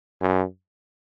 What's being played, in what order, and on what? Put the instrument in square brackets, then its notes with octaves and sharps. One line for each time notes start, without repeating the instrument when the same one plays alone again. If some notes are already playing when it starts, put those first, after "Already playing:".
[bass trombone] F#2